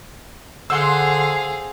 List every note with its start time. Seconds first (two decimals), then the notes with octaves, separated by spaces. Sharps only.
0.70 D3 G#4 C5 F5 F#5 C6 E6